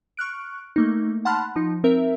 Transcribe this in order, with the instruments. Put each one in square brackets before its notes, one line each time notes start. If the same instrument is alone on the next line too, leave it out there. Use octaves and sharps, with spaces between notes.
[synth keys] C#6 F6 F#6 D7
A3 A#3 D#4
F#5 A5 B5 C6 F6 F#6
F3 D#4
C4 A#4 E5